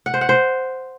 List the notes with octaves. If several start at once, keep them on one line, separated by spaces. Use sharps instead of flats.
F#5
C5
F#5
C5